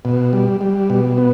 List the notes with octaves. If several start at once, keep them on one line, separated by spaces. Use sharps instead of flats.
B2
G3
G3
B2
B3